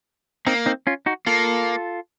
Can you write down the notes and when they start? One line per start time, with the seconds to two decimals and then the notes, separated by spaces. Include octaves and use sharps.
0.46 A#3 C4 D#4
0.66 C4 D#4
0.87 C#4 F4
1.06 D#4 F#4
1.26 A#3 F4 A4